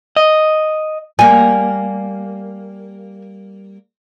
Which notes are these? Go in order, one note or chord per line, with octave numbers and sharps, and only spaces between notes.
D#5
G3 A#3 G#5